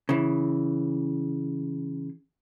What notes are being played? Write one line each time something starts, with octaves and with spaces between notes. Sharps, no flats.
C#3 E3